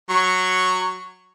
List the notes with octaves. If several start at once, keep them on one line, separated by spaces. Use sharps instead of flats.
F#3 C#6